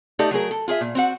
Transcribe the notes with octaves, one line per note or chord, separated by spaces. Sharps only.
A3 D#4 G4 A4 D5 D#5
F#3 A3 G#4 A#4
A4
F4 G#4 A#4 E5
A#2
C4 F#4 F#5